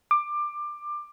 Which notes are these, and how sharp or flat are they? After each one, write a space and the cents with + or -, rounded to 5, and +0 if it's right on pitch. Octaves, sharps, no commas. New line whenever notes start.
D6 +20